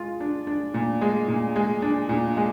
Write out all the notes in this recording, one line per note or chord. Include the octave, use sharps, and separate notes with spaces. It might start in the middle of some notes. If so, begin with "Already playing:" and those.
Already playing: G#3 F4
D4
D4
A#2
G#3
A#2
G#3
D4
A#2
G#3